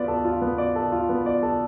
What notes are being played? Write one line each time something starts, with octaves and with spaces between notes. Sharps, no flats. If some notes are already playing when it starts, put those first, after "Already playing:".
Already playing: B3 F4 D5
A4
F4
B3
D5
A4
F4
B3
D5
A4